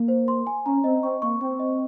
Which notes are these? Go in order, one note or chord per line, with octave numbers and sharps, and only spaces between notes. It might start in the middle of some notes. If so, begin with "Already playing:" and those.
Already playing: A#3
C5
C6
G#5
C#4 A#5
C4 D#5
C4 C#6
A#3 C#6
C4 C#6
D#5